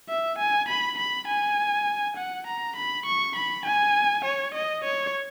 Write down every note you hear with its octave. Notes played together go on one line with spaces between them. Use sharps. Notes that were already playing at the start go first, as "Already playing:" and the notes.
E5
G#5
B5
B5
G#5
F#5
A#5
B5
C#6
B5
G#5
C#5
D#5
C#5